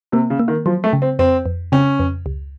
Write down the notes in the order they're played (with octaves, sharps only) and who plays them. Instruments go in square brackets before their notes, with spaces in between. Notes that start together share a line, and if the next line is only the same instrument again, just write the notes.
[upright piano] C3 [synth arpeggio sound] A#3
[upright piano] C#3
[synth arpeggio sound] A#3
[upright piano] D#3
[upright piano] F3 [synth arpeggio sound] F#3
[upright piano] A3
[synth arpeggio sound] C#3
[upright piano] C4
[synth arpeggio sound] F2 [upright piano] C4
[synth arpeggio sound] F2
[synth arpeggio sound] C#3 [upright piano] C#4
[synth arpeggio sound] F2
C#2